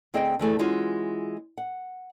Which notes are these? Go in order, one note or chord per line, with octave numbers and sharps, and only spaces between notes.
D2 C4 G#4 D#5 E5 G5
D2 E3 A3 G#4
E3 G#3 C#4 F4 F#4
F#5